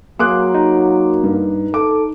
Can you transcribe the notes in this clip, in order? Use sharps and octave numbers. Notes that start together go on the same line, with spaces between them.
F#3 A#3 G#4 C6 D6 F#6
D#4
G2
A4 D6